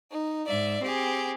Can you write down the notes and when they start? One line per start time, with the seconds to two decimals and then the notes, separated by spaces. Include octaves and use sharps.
0.11 D#4
0.47 G#2 D5 E5
0.81 C4 G4 G#4